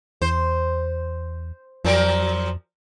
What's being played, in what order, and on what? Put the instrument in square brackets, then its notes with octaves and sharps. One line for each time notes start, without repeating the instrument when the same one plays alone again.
[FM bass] E2 [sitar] C5
[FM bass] F2 [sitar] F3 F#3 A#4